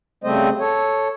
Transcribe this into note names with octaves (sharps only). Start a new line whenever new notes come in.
C#3 G3 A3 C4 C5 D#5
A4 C#5